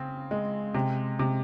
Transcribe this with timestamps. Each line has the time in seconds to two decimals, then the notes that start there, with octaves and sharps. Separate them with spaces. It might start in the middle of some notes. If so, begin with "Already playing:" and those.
Already playing: C#3 C4
0.31 G#3
0.74 C3
1.19 C3